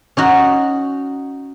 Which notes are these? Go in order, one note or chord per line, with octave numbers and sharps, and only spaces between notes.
C#4 D#4 F#4